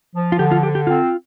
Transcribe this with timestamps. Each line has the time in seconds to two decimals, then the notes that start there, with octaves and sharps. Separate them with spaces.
0.15 F3
0.32 F4
0.39 D3 G4
0.51 F4
0.63 D3 G4
0.75 G4
0.87 C4 F4